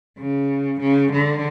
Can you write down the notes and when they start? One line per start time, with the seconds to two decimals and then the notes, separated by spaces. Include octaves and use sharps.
0.18 C#3
0.81 C#3
1.12 D3